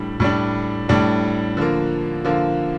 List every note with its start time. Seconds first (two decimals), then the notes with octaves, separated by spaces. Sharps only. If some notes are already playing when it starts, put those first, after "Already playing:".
Already playing: A2 G3 D4
0.20 A2 G3 D4
0.89 A2 G3 D4
1.57 D3 F3 A#3
2.25 D3 F3 A#3